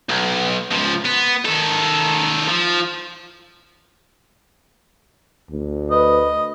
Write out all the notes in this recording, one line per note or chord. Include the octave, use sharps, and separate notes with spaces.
B1
C#2 F3
B3
D#3 A4
F3
D2
B4 D#5